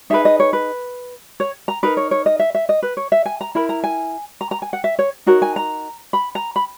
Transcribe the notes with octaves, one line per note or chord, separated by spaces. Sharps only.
D#4 G#4 B4 E5
D#5
C#5
B4
C#5
A#5
D#4 A#4 B4
C#5
C#5
D#5
E5
E5
D#5
B4
C#5
E5
G#5
A#5
E4 A#4 B5
A#5
G#5
A#5
A#5
G#5
F#5
E5
C#5
D#4 F#4 A#4 C#5
G#5
A#5
B5
A#5
B5